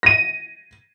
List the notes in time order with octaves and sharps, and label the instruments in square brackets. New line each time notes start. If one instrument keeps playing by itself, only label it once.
[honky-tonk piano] A#6 D#7